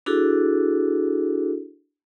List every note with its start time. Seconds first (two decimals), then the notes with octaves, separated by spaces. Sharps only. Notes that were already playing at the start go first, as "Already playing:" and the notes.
0.06 D4 E4 F#4 G#4 A4